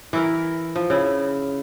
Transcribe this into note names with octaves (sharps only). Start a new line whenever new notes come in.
E3 E4 A#4
F3
C#3 E4